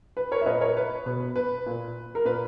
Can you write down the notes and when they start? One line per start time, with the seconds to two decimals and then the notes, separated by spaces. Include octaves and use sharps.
0.17 B4
0.31 A#4 C#5
0.41 E5
0.46 A#2 B4 D#5
0.61 A#4 C#5
0.77 B4
1.06 B2 B4
1.20 B4
1.36 B4
1.66 A#2
2.15 A#4
2.25 A#2 B4